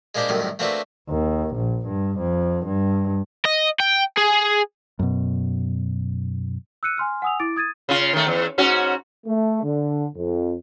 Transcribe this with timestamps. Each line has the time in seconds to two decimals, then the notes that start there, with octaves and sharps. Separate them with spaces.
0.15 G#3 A#3 D4 G4 C5
0.29 C2 F#2 A2 C3 D#3
0.59 A3 A#3 C4 D4 F#4 B4
1.09 D#2
1.55 A#1
1.87 G2
2.18 F2
2.65 G2
3.45 D#5
3.80 G5
4.18 G#4
4.99 F#2 B2
6.83 E6 F#6 C#7 D#7
6.97 G#5 C6 F6
7.22 F#5 G#5 D#6 E6 F7
7.40 E4 D6 A6 D7
7.56 D#6 G#6 A6 D#7
7.89 C#3 F4
8.13 D#3 A3
8.27 E2
8.58 G#2 C#4 F#4
9.27 A3
9.63 D3
10.16 F2